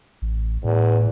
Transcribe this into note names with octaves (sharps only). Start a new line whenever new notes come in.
A1
E2 A2